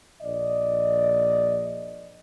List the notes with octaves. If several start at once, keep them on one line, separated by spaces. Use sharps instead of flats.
A#1 D5 D#5